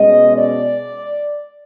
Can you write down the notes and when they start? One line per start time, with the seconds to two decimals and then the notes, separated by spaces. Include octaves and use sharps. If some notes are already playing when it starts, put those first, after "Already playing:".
Already playing: B2 G#3 C#4 D#5
0.37 D5